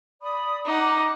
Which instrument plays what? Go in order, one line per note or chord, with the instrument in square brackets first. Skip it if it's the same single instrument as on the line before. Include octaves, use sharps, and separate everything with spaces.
[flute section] D5 B5 D#6
[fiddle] D#4 F#5 [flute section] A#5 D6